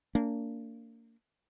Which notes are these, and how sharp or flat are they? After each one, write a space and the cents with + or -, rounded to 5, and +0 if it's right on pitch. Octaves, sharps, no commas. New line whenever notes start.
A#3 -25 D4 -30